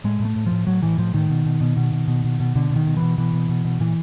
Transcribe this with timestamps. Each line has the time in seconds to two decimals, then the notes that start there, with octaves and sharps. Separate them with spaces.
0.04 A2 G#3
0.20 A2
0.25 A3
0.36 A2
0.46 A2 F3
0.67 A2 F#3
0.83 A2 E3
0.98 A2 F3
1.14 A2 D#3
1.30 B2
1.46 B2
1.61 B2
1.76 B2
1.93 B2
2.08 B2
2.24 B2
2.40 B2
2.55 B2 D3
2.70 B2
2.76 D#3
2.87 B2
2.97 E3
3.02 B2
3.18 B2 E3
3.33 B2
3.49 B2
3.65 B2
3.80 A#2 E3